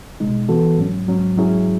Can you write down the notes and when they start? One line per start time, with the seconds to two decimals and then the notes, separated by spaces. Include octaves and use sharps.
0.20 B2 G#3 D#4
0.48 E3 B3 F#4 A4
0.78 G#2 F#3 C#4
1.08 G#2 F#3 C#4
1.37 G#2 F#3 C#4 E4 G#4